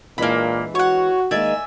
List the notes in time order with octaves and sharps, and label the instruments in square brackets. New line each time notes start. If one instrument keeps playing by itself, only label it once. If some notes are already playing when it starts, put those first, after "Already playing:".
[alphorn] A#2 [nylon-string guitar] E3 G#3 D4 [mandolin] A#3 B5
[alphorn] F#4 [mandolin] C#5 F#5
[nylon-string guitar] D#3 G#3 A#3 [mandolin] D5 E5 G#5